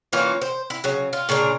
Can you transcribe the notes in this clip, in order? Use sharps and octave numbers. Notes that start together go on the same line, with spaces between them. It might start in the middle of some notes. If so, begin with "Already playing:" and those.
E3 A#3 C#4 F4
C5
E4
C#3 F#3
F4
A#2 C#3 D4 A#4